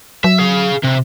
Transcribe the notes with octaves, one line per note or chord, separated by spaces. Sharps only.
F#3 E5
G#4 F5
C3